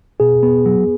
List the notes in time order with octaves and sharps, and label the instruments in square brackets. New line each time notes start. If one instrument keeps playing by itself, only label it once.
[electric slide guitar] B2 [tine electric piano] G#4
[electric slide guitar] B3
F#3